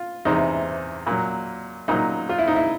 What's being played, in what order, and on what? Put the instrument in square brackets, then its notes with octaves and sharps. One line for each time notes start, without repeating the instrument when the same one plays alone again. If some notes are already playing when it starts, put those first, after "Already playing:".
Already playing: [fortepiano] F4
E2 C3 E3 D#4
A#2 F#3
A#2 F#3 D#4
F4
E4
D#4
E4